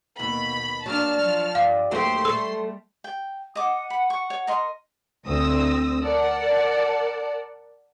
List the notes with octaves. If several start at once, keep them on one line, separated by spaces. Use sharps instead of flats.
D#2 B2 B5
F#3 A#3 D4 A5 F6
F3
G2 F5
D#2 F#3 A3 G4 C5 C6
G3 A3 A4 E6
G5
D#5 F#5 D6
B5
C#6
C#5
A#4 D#5 C6
D2 C4 D#6 E6 A#6
A#4 D5 F#5 A5